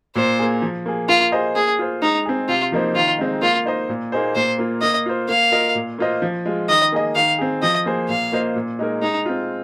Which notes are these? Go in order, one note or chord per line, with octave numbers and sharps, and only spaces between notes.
A#2 C5
A#3 G#4
F3
A#3 G#4
A#3 F4
G#4 C5 D#5
A#3 G#4
F4 C5
G#3 D#4
C4 G#4
C3 F4
F3 A#3 D#4 C5
D#3 F4
G#3 C4 D#4
A#3 F4
D#4 C5 D#5
A#2
A#3 D#4 G#4 C5
A#2 C5
A#3 F4
A#3 D#5
F4 C5
A#3 F5
F4 A#4 D#5
A#2
A#3 F4 C5 D#5
F3
G#3 F4
D#3 D#5
A#3 G#4 D#5
D#3 F5
C4 G#4
F3 D#5
A#3 G#4 C5
A#2 F5
A#3 F4 C5 D#5
A#2
G#3 D#4 A#4
G#3 D#4
C4 F4